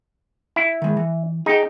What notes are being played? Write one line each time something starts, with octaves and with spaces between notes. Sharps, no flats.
E4
D#3 G#3
E3
D#4 G#4 G5